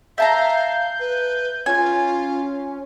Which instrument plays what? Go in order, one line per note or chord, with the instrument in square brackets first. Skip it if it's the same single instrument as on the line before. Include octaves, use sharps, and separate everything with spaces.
[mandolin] E5 A5 A#5 [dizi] F5 [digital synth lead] G6
[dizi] B4
[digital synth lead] C#4 [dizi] F4 [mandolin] G#5